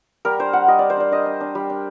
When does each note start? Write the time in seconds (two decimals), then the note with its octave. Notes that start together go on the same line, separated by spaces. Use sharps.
0.25 G3 A#4
0.39 D4 C5
0.53 G3 F#5
0.68 G3 D#5
0.79 D4 D5
0.90 C5
0.97 D4 D5
1.11 D4 D#5
1.26 D4
1.41 D4
1.55 G3
1.70 D4